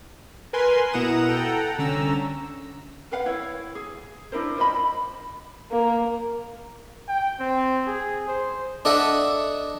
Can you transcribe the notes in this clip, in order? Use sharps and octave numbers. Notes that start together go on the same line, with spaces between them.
A#4 B4 G#5 C6
B2 E4 F#5 A#5 D#6 E7
A4 F#5 G5 A#5
C2 D3 C#4 A#5 E6
A#4 B4 F5 F#5
E4 C#5
G#4
D4 E4 A#4 C5
F4 C5 D#5 B5
A#3
G5
C4
G#4
C5
D4 A4 D#5 E5 F#5